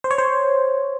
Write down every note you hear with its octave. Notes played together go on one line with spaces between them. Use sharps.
C5
C#5
C5